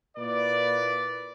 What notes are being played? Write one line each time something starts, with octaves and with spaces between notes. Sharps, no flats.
A#2 A#3 E4 B4 D5